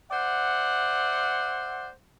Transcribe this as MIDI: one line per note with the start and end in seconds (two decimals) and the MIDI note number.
0.11 1.89 72
0.11 1.89 74
0.11 1.89 76
0.11 1.89 78